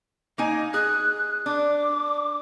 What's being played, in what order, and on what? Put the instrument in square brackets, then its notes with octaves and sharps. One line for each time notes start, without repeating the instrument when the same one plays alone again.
[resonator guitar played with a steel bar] A#3 D#4 G#5 [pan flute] D#5
[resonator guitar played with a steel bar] G#4 [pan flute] F#6
[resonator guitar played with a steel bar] D4 [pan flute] D6